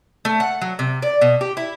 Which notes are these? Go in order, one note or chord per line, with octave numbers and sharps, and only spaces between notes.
A3
F#5
F#3
C3
D5
B2
G4
E4